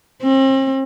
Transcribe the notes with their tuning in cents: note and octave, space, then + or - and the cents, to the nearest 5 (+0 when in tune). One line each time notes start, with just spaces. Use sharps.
C4 +40